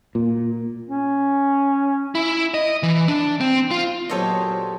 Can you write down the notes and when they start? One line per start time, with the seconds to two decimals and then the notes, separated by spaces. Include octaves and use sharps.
0.15 A#2
0.89 C#4
2.15 E4
2.54 D#5
2.83 E3
3.08 D4
3.41 C4
3.71 F4
4.09 A#2 F#3 B3 G4 A4 C5 C#5 D#5